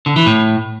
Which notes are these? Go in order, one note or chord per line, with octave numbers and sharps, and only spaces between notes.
D3
E3
A2